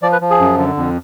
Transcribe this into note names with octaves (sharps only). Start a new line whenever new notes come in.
F3 D5
B4
F3
G#4
F#2
D3
F2